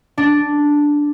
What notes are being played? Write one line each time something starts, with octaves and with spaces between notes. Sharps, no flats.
D4